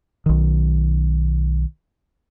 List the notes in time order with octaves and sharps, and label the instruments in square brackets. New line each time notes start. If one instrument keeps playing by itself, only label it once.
[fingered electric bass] B1 D#3